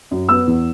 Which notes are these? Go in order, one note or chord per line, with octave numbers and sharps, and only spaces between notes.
F#2
B3 E6
E2